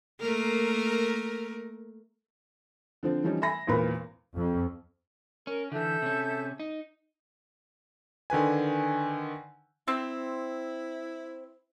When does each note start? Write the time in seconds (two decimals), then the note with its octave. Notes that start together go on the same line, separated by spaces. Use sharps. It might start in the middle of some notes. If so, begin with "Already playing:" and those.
0.21 A3 A#3 A#4
3.03 D3 F3 C4
3.24 E3 F3 G3 C#4 D#4
3.42 E5 G#5 B5 A#6
3.67 G#1 E2 A#2 A#4 B4 B5
4.36 F2
5.47 C#4 A#4
5.72 D3 E3 A4 E5 G6
6.02 C3 C#4
6.60 D#4
8.30 D3 D#3 B4 G#5
9.88 C4 E4